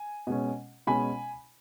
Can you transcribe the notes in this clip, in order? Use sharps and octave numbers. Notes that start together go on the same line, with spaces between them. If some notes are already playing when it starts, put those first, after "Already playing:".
Already playing: G#5
B2 G#3 C#4
B2 G#3 C#4 G#5 B5